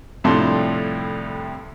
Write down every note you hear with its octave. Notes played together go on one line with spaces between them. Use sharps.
C2 F2 A2 D4 A5 C6